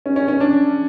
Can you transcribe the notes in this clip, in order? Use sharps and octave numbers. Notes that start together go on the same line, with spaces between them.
C#4
C#4
C#4
D4